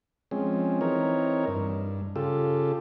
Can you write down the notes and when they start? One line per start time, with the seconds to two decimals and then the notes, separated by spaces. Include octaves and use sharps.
0.31 F3 G#3 C4 C#4
0.81 E3 C4 D#4 A#4 C#5
1.48 G2
2.16 C#3 F4 G4 A4